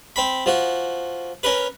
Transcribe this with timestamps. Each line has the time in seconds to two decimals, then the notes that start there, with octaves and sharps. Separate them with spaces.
0.16 C4 B5
0.46 F3 F#4
1.43 C#4 A#4 B4